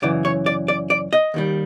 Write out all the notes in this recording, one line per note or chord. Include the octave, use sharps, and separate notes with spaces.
F#2 C#3 E3 D5
C#5
D5
D5
D5
D#5
D#2 D#3 G3